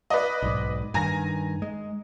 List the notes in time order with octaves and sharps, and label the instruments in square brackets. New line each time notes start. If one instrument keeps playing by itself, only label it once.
[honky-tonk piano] B4 D5 D#5
[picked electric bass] B1 G#2
[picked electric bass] G2 D#3 [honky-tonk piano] G#5 A#5 A#6
[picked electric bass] G#3